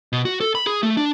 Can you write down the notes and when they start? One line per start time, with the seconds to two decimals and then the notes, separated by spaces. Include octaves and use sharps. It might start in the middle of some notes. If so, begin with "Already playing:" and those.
0.13 B2
0.25 F#4
0.40 A4
0.55 B5
0.67 G#4
0.83 A3
0.97 D4